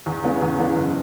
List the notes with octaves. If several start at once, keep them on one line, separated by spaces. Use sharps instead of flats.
E2
C#3 E3 B3
E2
C#3 E3 B3
F#1